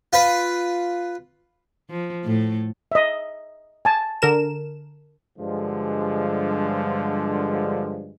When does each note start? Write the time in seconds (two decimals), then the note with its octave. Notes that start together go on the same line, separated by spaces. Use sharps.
0.13 F4 B4 B5
1.90 F3
2.25 A2 A3
2.92 D#5 E5
3.85 G#5 A5
4.22 D3 A#4 E7
5.38 G2 D3 F3 G#3